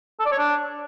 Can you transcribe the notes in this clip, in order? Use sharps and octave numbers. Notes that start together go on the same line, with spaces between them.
A4
D5
C#5
D4